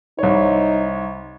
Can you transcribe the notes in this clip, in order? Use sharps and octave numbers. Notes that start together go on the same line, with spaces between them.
C2 D#4 C#5